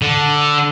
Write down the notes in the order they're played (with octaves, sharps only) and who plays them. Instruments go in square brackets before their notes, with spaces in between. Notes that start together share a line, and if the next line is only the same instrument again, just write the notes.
[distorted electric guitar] D3